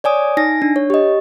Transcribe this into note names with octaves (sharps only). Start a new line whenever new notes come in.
C#5 D5 G#5 D#6
D#4 G#5 A#6
D4
C#5
G4 D#5